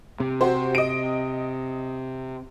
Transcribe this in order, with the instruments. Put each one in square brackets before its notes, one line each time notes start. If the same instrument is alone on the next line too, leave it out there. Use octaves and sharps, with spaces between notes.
[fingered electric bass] C3
[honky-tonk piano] F#4 G4 C5
D#5 D7